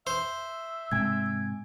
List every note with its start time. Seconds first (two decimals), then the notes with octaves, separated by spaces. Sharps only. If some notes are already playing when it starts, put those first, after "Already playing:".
0.07 C5 E5
0.92 G#2 C3 G#3 G#5 G#6